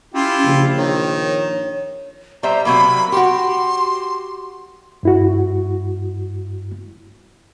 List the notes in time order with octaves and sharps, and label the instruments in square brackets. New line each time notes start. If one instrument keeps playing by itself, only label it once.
[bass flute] C#4 [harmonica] E4 F4 G4
[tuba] A#1 [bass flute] C#3
[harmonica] D#3 [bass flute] C#5
[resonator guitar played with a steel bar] G3 C5 E5 [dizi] A#5
[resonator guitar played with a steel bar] C3 F#3 A#3 [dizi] B5
[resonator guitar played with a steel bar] F#4 G4 [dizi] C6
[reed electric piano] G2 E4 F#4